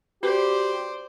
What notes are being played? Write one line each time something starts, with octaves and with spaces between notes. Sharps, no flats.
F#4 G4 C5 D5